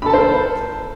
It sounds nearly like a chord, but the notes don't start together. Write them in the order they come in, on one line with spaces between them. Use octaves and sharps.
B5 A4 A5 C5 A#4